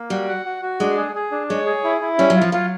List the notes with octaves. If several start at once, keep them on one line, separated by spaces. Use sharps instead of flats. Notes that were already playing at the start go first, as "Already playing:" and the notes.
Already playing: A#3
G3 F#4
F#5
F#4
F#4
G#3 D4
G#4
G#4
D4
G#3 C#5
G#4
E4
E4
G3 C#4
F#3
F4
F3
F#3 F4